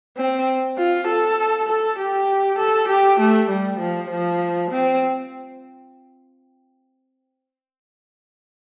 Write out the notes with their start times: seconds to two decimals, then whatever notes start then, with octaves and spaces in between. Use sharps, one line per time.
0.17 C4
0.78 F4
1.07 A4
1.69 A4
1.99 G4
2.59 A4
2.88 G4
3.20 A3
3.49 G3
3.79 F3
4.10 F3
4.71 C4